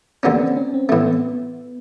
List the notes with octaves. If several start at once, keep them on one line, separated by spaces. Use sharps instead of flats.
D#2 D3 F#3 A#3 B3 C#4
C4
C#4
C4
A2 E3 A3 B3
B3